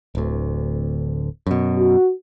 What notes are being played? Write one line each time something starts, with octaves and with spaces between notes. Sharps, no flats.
D1 D2
F#2 B2
F#4